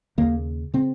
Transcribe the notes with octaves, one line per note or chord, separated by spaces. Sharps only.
D#2 C#3 A#3
C#3 C4